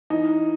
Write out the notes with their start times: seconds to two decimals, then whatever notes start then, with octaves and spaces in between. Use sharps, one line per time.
0.10 E3 D#4